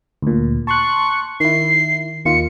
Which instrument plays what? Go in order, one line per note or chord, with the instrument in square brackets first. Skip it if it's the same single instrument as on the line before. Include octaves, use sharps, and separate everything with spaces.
[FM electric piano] D2 A#2
[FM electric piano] A5 C6 F#6 [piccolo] C#6
[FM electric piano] D#3 E4 [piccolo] C7
[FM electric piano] D#2 D#3 F4 [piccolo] C#7